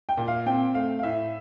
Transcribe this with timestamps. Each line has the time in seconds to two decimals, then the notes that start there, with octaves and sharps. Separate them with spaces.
0.09 G5
0.17 A#2
0.28 F5
0.46 C4 G5
0.74 A3 F5
0.99 F5
1.03 A2 E5